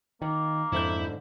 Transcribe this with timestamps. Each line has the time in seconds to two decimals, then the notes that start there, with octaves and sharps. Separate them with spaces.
0.22 D#3 A#3
0.72 F2 G#2 D3 E4 G6